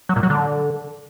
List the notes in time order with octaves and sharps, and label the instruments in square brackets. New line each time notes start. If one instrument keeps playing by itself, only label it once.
[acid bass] F#3
A#2
F#3
D3